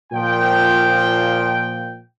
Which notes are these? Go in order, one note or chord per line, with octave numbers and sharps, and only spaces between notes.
A#2 F3 G5